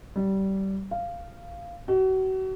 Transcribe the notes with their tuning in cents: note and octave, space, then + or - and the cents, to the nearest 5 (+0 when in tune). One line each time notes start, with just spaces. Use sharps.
G3 -20
F5 -10
F#4 +35